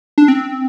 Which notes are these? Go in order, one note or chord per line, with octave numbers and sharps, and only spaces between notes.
D4
C4